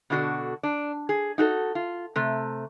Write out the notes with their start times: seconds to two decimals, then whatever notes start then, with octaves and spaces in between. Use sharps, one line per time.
0.10 B2 D3 D4 F#4 A4
0.63 D4
1.09 G#4
1.38 D#4 F#4 G#4 A4
1.75 F4
2.16 C3 A3